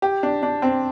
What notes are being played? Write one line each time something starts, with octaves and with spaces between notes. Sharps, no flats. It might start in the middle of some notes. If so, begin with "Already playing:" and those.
G4
D4
D4
C4